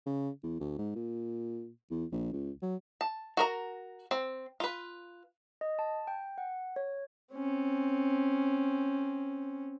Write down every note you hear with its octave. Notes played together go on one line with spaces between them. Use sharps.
C#3
E2
D2
G#2
A#2
E2
A#1
C#2
F#3
A5
F#4 A#4 A#5
C4
F4 B4
D#5
A5
G5
F#5
C#5
C4 C#4